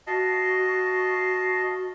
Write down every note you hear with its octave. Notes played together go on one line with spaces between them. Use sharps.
F#4 D#5 F5 A5